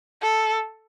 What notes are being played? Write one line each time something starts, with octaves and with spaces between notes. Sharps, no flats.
A4